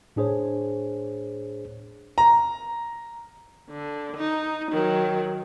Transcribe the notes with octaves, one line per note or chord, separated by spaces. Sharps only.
A2 D4 G#4 C5 C#5
A#5
D3
D#4
D#3 F#3